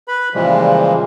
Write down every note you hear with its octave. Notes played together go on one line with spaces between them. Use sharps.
B4 B5
A#2 C#3 E3 F3 G3 G#3